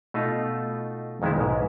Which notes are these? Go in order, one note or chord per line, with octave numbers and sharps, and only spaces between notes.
B2 A3 D#4 F4
F2 D#3 G#3 B3 E4
B1 G#2